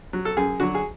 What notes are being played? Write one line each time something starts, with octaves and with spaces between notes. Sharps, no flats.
F#3
A4
F#2 G#4
D3 F#3 F#4
G#4